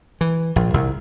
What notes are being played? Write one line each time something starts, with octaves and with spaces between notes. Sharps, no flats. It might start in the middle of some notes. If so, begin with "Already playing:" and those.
E3
A#1
C2